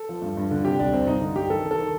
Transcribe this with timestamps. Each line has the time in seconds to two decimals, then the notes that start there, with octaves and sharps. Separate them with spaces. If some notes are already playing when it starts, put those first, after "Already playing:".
Already playing: A4
0.09 F3
0.22 G2
0.37 G2
0.51 D3
0.65 C3 G4
0.79 C2 D4
0.93 C2 C4
1.07 G2 D#4
1.21 D3
1.36 G2 G4
1.50 D#3 A4
1.64 D#3
1.71 A4
1.78 D#3